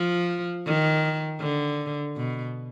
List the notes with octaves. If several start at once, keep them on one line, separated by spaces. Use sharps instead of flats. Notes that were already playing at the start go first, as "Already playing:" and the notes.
Already playing: F3
D#3
D3
B2